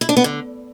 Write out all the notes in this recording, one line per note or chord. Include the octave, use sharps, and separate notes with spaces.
E4
D4
B3
D3